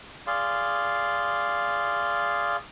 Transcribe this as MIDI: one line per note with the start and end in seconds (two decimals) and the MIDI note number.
0.27 2.57 68
0.27 2.57 74
0.27 2.57 77
0.27 2.57 84